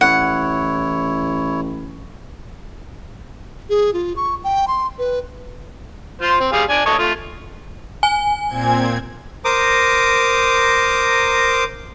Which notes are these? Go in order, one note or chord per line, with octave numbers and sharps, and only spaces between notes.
A1 E4 C#5 F#5
G#4
F4
C#6
G5
C6
B4
F4 C5
C4
G3 G#4 F5
D4 G#5
A4 C#5 D#5
A3 F4
G#5
A#2 C4 G#6
A#4 C5 A#5 D6 D#6